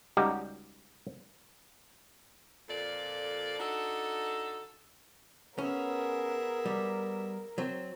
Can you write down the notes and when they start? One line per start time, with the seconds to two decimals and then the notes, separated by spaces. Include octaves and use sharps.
0.17 C#2 G3 D#4 F#4 G4 A5
2.69 F2 A#2 A4 D5
3.59 D4 D#4 F#4 A4
5.58 B3 C#4 G#4 A#4 E5
6.66 G3
7.58 F#3 C4